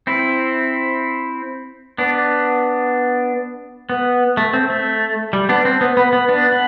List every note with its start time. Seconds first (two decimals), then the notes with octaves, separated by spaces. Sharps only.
0.07 C4 E4
1.98 B3 D4
3.90 B3
4.37 A3
4.53 C4
4.70 A3
5.33 G3
5.49 B3 D4
5.65 C4
5.81 B3
5.97 B3
6.13 B3
6.29 B3 D4
6.52 B3